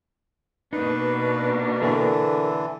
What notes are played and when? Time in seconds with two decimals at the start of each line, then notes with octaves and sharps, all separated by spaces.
0.73 B2 A#3 D4 D#4 B4
1.82 D3 E3 A4 A#4 D5